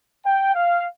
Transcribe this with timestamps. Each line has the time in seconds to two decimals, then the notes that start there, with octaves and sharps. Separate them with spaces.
0.25 G5
0.54 F5